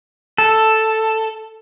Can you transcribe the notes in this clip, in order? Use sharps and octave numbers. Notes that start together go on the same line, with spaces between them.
A4